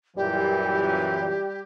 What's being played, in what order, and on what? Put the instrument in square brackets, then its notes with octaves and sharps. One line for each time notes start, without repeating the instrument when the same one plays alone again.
[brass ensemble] F#2 A#2 E3 [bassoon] G3 [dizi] G4
[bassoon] G3